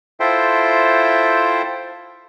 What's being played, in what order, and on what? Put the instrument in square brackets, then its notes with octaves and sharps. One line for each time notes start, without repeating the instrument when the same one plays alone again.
[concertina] E4 F4 A4 C5 E5 G5